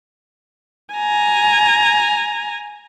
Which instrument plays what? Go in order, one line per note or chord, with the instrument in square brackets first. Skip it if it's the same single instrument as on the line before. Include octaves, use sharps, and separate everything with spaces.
[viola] G#5 A#5